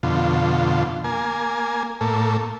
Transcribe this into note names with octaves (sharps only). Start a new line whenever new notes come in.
F2 B2 D3 F4
A#3 G#5
A2 A#3 A4